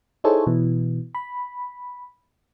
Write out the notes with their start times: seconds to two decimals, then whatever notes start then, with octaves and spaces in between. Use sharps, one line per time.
0.24 D#4 E4 G#4 A4 C5 C#5
0.47 B2 E3
1.15 B5